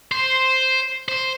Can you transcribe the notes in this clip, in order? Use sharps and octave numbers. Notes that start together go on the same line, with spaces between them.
C5
C5